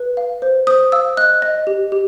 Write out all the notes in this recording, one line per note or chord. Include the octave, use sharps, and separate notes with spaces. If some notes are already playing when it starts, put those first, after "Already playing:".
Already playing: B4
F5
C5
C5 D#6
F5 E6
D#5 F#6
D#5
G4
G4